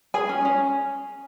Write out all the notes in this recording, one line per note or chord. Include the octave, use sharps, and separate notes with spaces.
G#4 G#5
C#4
C#4